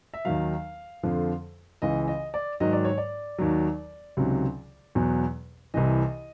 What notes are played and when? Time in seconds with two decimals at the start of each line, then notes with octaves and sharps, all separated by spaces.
0.14 E5
0.25 D#2 D#3 F#3 F5
1.03 F2 D3 F3
1.82 C#2 C#3 E3 D#5
2.08 D#5
2.34 D5
2.60 G#2 D#3 F#3 D#5
2.72 D5
2.85 C#5
2.98 D5
3.38 D#2 D#3 F#3
4.17 C#2 C3 D#3 F#3
4.95 E2 B2 F#3
5.74 C2 C3 E3 D#5